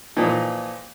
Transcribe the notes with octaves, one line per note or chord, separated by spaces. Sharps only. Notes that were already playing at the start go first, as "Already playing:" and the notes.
A#2 E3 F3 D#4